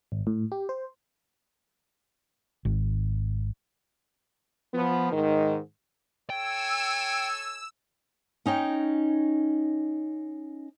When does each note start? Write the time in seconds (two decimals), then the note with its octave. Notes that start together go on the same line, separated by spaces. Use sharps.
0.12 G#1
0.27 A2
0.52 G4
0.69 C5
2.65 G#1
4.74 F3 B3
5.12 G#2 D#3
6.30 A4 C#5 G5 G#5 E6
8.46 C#4 D#4 C#5 G5